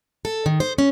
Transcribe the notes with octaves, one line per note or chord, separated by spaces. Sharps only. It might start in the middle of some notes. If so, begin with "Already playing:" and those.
A4
D#3
C5
C#4